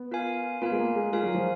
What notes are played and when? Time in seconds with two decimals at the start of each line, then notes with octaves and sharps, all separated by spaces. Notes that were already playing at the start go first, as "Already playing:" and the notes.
Already playing: B3
0.11 F4 A#4 F5 G#5
0.62 B3 F4 A#4 F5 G#5
0.72 G#3
0.80 A#3
0.96 G#3
1.12 G#3 F4 A#4 F5 G#5
1.23 F#3
1.35 F3